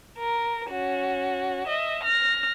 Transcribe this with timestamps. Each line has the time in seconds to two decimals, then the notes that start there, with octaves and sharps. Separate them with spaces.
0.18 A#4
0.70 C#4 F#4
1.67 D#5 E5
2.03 F6 A#6